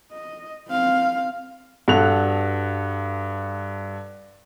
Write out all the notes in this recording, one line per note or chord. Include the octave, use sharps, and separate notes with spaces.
D#5
C4 F5
G2 F#4 A4 F#6 F7